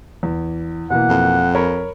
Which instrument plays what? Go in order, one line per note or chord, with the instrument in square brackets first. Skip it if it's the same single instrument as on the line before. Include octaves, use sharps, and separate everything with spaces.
[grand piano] E2
[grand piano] B2 E3 A#3 [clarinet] F#5
[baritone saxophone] F2
[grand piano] A#4 C#5 B5